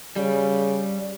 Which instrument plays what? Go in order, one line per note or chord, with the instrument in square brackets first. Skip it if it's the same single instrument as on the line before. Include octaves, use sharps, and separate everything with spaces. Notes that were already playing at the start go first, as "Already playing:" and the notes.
[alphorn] C#3 [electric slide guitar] G3